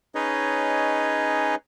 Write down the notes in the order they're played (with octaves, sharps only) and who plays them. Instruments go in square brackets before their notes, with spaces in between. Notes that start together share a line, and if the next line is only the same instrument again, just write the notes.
[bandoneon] C#4 D#4 G#4 B4 C#5 D#5